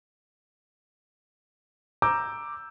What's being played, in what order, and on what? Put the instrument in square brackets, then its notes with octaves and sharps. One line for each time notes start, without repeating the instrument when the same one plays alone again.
[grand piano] A#5 D6 E6 G6